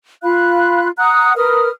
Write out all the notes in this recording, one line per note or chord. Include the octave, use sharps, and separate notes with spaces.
F4 F5 B5 F#6
F#5 A#5 D#6 F#6
A#4 B4 D#6 F6